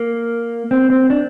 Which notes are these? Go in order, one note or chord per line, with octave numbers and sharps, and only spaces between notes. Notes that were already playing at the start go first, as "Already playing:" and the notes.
Already playing: A#3
C4
C4
D4